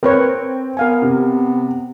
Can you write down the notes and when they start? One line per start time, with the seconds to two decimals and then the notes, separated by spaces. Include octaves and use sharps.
0.03 C4 A#4 B4 C#5
0.77 B3 A#4 F5 G#5
1.02 C3